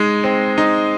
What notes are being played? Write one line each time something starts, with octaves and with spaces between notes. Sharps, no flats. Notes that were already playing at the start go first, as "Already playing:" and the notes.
Already playing: G#3 D#4
C4
D#4